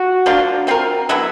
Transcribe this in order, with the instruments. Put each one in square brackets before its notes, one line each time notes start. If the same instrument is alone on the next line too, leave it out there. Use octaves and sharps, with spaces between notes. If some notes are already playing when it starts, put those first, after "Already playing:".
Already playing: [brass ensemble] F#4
[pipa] F3 A#3 D4 F4
A3 C4 F4 A#4
D3 F#3 B3 E4